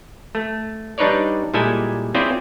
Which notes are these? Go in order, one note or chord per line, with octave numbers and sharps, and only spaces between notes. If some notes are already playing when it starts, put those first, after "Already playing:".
A3
G3 D4 D#4 B4 C#5 D5
A#2 G3 G#3 E4 A4 G#5
C4 C#4 E4 F4 G#4 D5